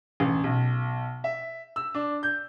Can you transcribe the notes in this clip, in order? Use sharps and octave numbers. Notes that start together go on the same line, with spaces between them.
A1
B1
E5
E6
D4
G6